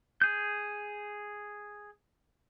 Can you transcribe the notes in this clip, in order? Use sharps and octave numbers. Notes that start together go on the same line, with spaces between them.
G#4 G6